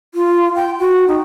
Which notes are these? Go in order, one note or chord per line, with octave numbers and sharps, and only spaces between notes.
F4
G5
F#4
D#4